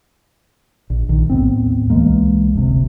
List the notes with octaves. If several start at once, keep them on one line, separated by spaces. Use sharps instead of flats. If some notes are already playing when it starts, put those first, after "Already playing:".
A#1
A#1 D#3
D#2 A2 B3 C4
C#2 E3 G#3 A#3
F#1 D2 C3